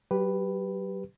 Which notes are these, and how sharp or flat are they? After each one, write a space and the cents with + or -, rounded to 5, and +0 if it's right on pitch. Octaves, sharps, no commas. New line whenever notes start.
F#3 +35 G4 +0 B4 +0